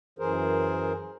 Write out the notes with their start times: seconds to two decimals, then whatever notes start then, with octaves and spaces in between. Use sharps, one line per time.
0.19 F#2 E3 G#4 A#4 C5